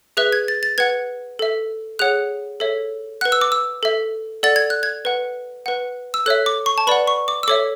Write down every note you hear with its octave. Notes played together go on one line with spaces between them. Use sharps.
G#4 B4 E5 F#6
G#6
A6
A6
B4 F#5 G#6
A4 E5
G#4 C#5 F#5 F#6
A4 C#5 E5
B4 F#5 F#6
E6
D6
E6
A4 E5
A4 D5 F#5 A6
G#6
F#6
G#6
B4 F#5
B4 F#5
E6
A4 C#5 E5 F#6
D6
C#6
A5
B4 D5 F#5 B5
C#6
D6
E6
A4 C#5 E5 D6